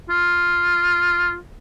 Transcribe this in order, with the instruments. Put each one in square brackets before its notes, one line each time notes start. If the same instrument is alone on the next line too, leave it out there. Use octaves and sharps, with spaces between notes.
[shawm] F4